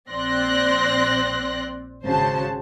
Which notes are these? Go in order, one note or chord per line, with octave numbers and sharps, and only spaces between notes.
A#1 C4 D5 C6 F#6 A#6
G#1 C#3 F#4 C5 A5